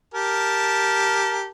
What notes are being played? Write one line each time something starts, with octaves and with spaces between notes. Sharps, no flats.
G4 A#4 A5